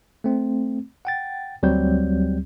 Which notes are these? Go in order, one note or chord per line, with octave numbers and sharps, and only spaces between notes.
A3 C4
F#5 G5 A6
D2 F#3 G3 C4 G4 G6